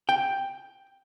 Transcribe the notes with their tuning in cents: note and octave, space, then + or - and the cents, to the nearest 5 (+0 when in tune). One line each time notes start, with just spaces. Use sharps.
G5 +5